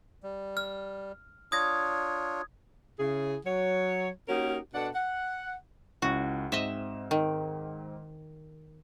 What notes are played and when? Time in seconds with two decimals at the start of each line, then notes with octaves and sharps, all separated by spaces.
0.23 G3
0.57 F6
1.52 D4 F4 C#5 D#6 G#6 A#6
2.99 C#3 E4 G#4
3.45 F#3 C#5
4.28 A#3 C#4 D#4 F#4 G4 A#4
4.74 B2 D4 A4 F#5
4.95 F#5
6.02 C#2 C#4 E4 F#4
6.52 G#2 C4 D#5 E5 E7
7.11 D#3